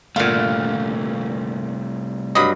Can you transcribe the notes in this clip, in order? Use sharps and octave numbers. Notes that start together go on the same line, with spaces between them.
G1 C2 A#2 A3 F5 F#5
G2 F#3 D#5 B5 D#6